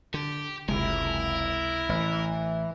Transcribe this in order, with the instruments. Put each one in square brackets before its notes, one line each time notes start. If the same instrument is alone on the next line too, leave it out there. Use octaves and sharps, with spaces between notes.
[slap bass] D3 [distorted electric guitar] G4
[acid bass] F#1 [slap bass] C#2 C3 G#3 [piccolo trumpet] E4 [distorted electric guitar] A#4
[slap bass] A1 [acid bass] E3